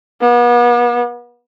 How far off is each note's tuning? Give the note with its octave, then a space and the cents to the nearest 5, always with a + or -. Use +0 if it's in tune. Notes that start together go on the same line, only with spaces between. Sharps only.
B3 -40